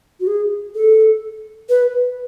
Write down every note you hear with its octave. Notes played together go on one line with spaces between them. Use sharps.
F#4
G#4
A4
B4